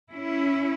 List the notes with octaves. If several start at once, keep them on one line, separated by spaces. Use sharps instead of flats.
C#4 E4